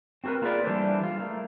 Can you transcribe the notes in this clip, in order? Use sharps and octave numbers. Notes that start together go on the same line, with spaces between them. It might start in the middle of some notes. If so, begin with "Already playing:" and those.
C4 F#4 G4 A#4 B4
A#3 F4 G#4 A#4 B4 D5
E3 G3 D4 G4 A4 C5
F4
A3 A#3